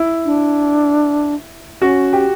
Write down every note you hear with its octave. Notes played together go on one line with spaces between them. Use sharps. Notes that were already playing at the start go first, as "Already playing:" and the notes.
Already playing: E4
D4
C#4 F#4
G4